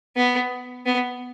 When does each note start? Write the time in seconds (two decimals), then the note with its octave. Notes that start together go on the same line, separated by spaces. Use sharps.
0.16 B3
0.86 B3